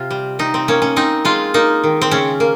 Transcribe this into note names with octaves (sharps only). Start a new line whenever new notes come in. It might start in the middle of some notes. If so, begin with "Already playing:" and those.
Already playing: C3 F4
G3
C3 D#4
C4
A#3 C#4
C#4
C4 D#4
G#3 F4
A#3 D#4
D#3
C4
C#3 C#4
A#3